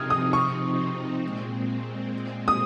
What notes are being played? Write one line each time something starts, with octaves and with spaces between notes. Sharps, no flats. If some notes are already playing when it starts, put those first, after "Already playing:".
Already playing: C3 F3 C4 D#4 D#6 F6 G#6
D#6
C#6
A#2 G#3 C4
D#6